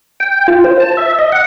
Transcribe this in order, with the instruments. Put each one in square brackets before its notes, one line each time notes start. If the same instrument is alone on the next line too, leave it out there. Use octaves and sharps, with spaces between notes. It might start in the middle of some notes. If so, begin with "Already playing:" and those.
[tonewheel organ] G5
F4
C5
A5
E5
D#5
F#5